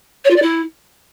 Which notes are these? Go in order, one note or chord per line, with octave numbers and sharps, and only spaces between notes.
C#5
F4
D5
E4